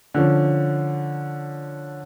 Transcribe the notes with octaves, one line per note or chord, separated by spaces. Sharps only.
D3 F3 C#4